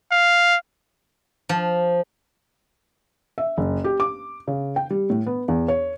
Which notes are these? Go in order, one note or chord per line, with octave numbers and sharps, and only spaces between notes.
F5
F3
E5
F#1
G4
D6
C#3
G5
G3
A2
B3
E2
C#5